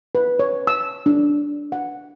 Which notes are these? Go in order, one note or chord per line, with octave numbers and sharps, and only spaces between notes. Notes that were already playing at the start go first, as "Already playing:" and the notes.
B4
C#5
E6
D4
F#5